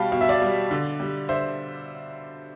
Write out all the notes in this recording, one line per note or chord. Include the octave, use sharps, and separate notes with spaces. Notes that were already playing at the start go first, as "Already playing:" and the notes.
Already playing: B2 G3 F5 G5 A5 B5
B2 F5
E5
D5 F5
G3
D3
G3
D3 C5 E5